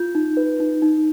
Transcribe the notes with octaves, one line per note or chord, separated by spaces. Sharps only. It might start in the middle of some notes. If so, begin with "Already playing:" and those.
Already playing: F4 G6
D#4
B4
D#4
D#4